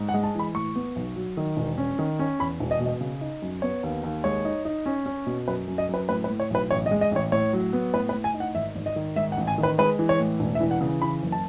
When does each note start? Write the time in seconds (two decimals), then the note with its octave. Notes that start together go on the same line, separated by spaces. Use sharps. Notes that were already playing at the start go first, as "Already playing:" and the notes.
Already playing: G#2
0.09 F#5
0.14 G#3
0.23 A5
0.35 E3 B5
0.55 A2 C#6
0.75 B3
0.96 B1
1.16 F#3
1.37 D#3
1.57 E1
1.78 C#4
1.99 D#3
2.19 C#4
2.39 E2 B5
2.60 E1
2.71 D#5
2.80 B2
2.86 D#5
3.01 C#3
3.21 D#4
3.42 F#2
3.62 B3 C#5
3.83 D#2
4.04 D#2
4.24 G#3 C#5
4.45 D#4
4.65 D#4
4.86 C#4
5.06 C#4
5.26 B2
5.48 F#2 B4
5.68 F#2
5.78 D#5
5.89 F#2 B4
6.09 A2 B4
6.24 B4
6.30 A2
6.40 C#5
6.50 B1 B4
6.70 A1 C#5
6.86 D#5
6.91 G#3
7.01 D#5
7.11 A1 C#5
7.32 A2 C#5
7.53 F#3
7.73 B3
7.94 A2 B4
8.09 B4
8.14 A2
8.24 G#5
8.34 D#4
8.40 F#5
8.55 G#1 E5
8.76 G#1
8.86 D#5
8.96 D#3
9.16 G#2 E5
9.32 F#5
9.37 A1
9.47 G#5
9.58 D#3
9.63 B4
9.78 G#3 B4
9.99 E3
10.09 C#5
10.20 A2
10.40 E1
10.55 E5
10.60 E3
10.71 F#5
10.81 C#3
11.02 E3 B5
11.22 F#1
11.32 A5